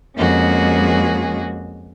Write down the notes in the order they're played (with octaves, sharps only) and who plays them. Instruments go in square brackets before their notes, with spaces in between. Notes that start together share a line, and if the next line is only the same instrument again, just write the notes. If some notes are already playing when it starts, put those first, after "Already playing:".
[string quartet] F2 G#3 A#3 C#4 F#4 G#4